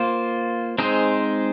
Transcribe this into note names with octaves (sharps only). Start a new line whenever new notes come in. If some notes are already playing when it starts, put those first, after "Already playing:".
Already playing: A#3 F4 C5
G#3 C4 D#4 G#4 C5